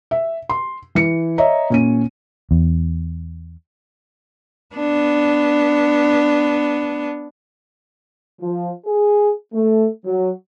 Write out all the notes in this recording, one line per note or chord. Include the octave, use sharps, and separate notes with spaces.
E5
C6
E3 C#7
C#5 D#5 E5 A#5
A#2 C#4 D#7
E2
B3 D4
F3
G#4
A3
F#3